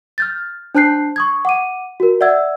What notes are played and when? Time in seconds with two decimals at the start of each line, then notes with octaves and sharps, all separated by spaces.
0.18 F6 G6 A6
0.75 D4 C5 A5 F#6 G6 C7
1.16 C#6 D#6 G#6
1.45 F#5 D6 D#7
2.00 F#4 A#4
2.21 D5 E5 F#5 E6 G#6